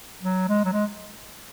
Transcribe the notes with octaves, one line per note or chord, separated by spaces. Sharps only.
F#3
G#3
F#3
G#3